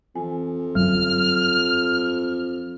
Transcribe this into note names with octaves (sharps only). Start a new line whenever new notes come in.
F2 E3 G#5
G1 F#2 F#3 F6